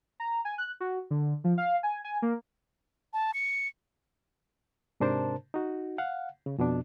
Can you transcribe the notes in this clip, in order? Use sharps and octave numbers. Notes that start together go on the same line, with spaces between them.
A#5
G#5
F#6
F#4
D3
F3
F5
G#5
G#5
A#3
A5
C#7
G#2 C3 D4 A#4 C5 A5
D#4 F#4
F5 F#5
C#3
F2 B2 B3 D4